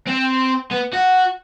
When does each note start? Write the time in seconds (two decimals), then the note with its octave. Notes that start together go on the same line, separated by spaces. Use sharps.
0.07 C4
0.71 B3
0.93 F#4